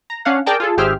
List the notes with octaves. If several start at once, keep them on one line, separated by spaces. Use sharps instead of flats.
A#5
C#4 D4 F5 F#5
G#4 A#4 D5 G5 A5
F4 G#4 A4
G#1 G4 G#4 C5 E5 F6